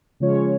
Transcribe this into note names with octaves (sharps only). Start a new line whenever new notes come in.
C#3 F3 G#3 F4 C#5